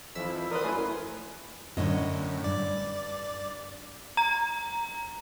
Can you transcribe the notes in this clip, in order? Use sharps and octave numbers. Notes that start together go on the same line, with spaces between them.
F2 E3 F3 E4 E6 B6
A#4 B4 D5 C6 D#6
F#2 A3 E4 G#5 B5 F#6
F#2 A2 D3 C#4 D#5
G2 D5
A#5